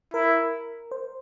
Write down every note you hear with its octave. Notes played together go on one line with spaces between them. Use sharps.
E4 A#4
C5